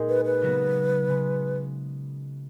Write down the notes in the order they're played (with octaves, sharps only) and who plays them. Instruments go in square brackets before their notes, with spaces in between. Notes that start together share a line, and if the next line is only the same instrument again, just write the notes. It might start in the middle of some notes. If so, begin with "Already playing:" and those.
Already playing: [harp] A#2 G#3 D#4 G#4
[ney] B4
B4
[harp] C#3 F#3 B3 F#4
C#3 G#3 B3